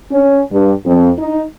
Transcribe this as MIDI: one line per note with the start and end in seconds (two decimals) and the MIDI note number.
0.11 0.41 61
0.51 0.72 43
0.85 1.10 41
1.18 1.42 63